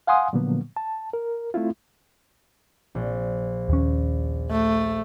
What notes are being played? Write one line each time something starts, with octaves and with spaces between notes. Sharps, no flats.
F5 F#5 G#5 C6 D#6
A#2 D3 F3 F#3 A#3 B3
A5
A#4
A3 C4 E4 F4
A#1
D#2 C#4
A3